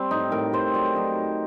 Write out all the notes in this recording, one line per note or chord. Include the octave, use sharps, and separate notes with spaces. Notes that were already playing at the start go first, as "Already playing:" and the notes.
Already playing: G3 C4
A2 D#4
A2 A#4
G3 C5
F#3 D5
F#3 D#4